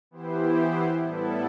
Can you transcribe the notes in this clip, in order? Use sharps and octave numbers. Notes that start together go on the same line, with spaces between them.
E3 B3 E4 G4 C5
A2 G3 B3 E4 A4